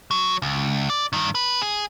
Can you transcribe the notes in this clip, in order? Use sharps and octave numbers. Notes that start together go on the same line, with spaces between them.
F#3
C#2
D5
G2 D#3
B4
G#4